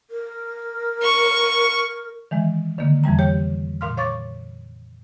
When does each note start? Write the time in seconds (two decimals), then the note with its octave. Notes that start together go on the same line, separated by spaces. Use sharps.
0.10 A#4
1.03 C#6
2.31 D#3 E3 G#3
2.78 D3 D#3 A#3
3.04 F2 E3 G3 A#5
3.19 G4 C#5 G5
3.81 A#2 F5 C6 F6
3.97 C#5 F5 C#6 D6 A6